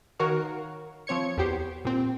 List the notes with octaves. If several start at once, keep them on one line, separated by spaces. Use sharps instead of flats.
D#3 F#4 A#4 C#5 F5
F3 C4 C#5 G#6 C#7
E2 B3 G4 C5
A#2 C4